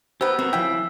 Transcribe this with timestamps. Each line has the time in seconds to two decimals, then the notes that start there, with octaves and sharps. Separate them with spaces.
0.21 D#3 B3 G4 C5 E6
0.39 B3 C4 F#4 A#4
0.53 C#3 F3 E4 G5 E6